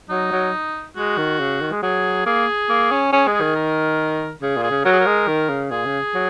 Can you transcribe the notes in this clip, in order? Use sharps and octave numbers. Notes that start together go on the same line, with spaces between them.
F#3 D#4
F#3
G#3 F#4
D#3
C#3
D#3
G#3
F#3 G#4
A#3 G#4
A#3
C#4
C#4 G#4
G#3
G#4
D#3
A#4
C#3 G#4
A#2
G#4
C#3
F#3 A#4
G#4
A#4
G#3
D#3
C#3
A#2 G#4
C#3
F#3